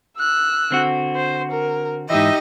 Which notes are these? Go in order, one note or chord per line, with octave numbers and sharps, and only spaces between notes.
E6 F#6
D3 C4 F#4
C5
A#4
G#2 E3 D#4 G4 D#5 E5